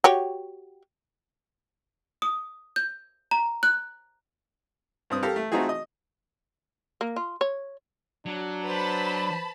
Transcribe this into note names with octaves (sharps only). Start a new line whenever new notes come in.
F#4 G4 C#5
D#6
G6
A#5
F#6
G2 C4 D#6
G4 A4 A#4 F5 A#5
A3
A3 C4 D#4 F4 F#4 G#4
D#5
A#3
F4
C#5
F#3 D4
B4 C5 A5 B5